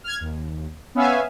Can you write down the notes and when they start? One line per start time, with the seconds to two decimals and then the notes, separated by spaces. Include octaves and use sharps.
0.04 F6 G#6
0.20 D#2
0.95 B3 C#4 E5 F5 G#5